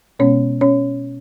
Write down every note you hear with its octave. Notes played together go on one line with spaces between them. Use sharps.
B2 G#3 B3 C#4 C#5
C#4 C#5